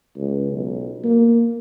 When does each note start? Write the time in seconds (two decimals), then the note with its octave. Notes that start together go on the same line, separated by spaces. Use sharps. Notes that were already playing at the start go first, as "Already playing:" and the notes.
0.17 C#2
0.52 B1
1.04 A#3